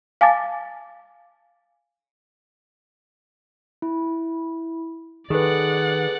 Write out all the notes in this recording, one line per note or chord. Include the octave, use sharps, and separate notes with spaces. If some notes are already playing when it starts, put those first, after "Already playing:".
F5 G#5 A5 D6 A6
E4
D#3 G#4 A4 B4 D5 F#5